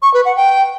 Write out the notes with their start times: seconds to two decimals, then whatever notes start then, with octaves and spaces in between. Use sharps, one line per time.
0.02 C#6
0.14 B4
0.25 F#5
0.36 G5